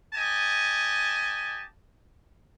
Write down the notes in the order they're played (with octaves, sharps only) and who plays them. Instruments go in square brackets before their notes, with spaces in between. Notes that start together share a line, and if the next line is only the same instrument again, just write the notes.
[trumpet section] G4 D#5 G#5 A5